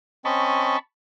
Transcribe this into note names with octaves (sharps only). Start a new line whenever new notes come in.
C4 C#4 D#5 A5 B5 C#6